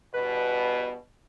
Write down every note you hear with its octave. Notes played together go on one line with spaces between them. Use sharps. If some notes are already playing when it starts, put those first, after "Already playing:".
E2 G2 B2 B4